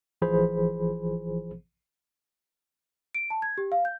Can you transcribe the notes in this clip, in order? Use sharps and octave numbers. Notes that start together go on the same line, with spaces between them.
A1 E3 F3 G#4 C5 B5
D7
A5
G#6
G4
F5
G6